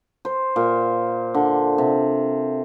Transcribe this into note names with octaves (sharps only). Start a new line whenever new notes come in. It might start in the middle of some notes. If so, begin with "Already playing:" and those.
C5
A#2
D3
C3